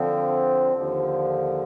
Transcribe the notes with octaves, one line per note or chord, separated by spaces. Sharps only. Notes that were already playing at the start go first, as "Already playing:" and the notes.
Already playing: D3 F3 C4
D#2 D3 F3